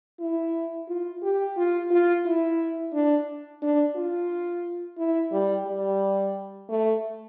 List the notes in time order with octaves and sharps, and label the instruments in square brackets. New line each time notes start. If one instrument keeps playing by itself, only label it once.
[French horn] E4
F4
G4
F4
F4
E4
D4
D4
F4
E4
G3
G3
A3